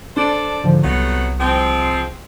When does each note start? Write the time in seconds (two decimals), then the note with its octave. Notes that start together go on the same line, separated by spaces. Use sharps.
0.17 D4 A4 C5 D5
0.64 G#2 D3 F3
0.83 C2 F#3 A3 B3
1.40 F3 G#3 C4